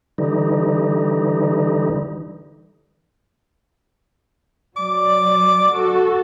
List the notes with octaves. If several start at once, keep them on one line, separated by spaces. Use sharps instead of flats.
D3 E3 G3 D#4
F#3 D5 D6
F#4 A4